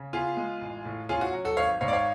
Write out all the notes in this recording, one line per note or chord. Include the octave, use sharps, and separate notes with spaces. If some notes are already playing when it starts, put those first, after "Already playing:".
Already playing: C#3
B3 F4 G#4
G#3
A1
A2
C#4 F4 G#4
F#4
F#3
F#4 A4
G#1 C#5 F5
G#2 C#5 F5
D5
C#5 F5